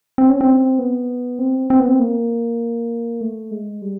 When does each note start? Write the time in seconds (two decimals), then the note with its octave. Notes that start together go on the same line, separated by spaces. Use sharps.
0.18 C4
0.30 C#4
0.41 C4
0.79 B3
1.39 C4
1.70 C4
1.80 B3
1.88 C4
1.99 A#3
3.21 A3
3.51 G#3
3.82 G3